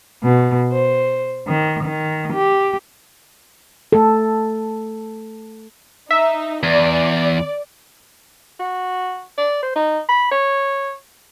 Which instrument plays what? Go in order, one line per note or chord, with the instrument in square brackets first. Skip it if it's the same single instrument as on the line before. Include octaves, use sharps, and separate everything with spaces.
[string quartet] B2
C5
D#3
D#3
G4
[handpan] A3 A4
[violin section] D#4 [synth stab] E5
[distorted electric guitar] E2 [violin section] D5
[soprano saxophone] F#4
D5
C5
D#4
B5
C#5